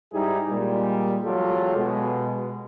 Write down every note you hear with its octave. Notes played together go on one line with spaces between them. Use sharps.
G#2 G3 D#4 E4 G4 G#4
A#2 G3 G#3
E2 F#3 G#3 F4 G4 A4
B2 G#3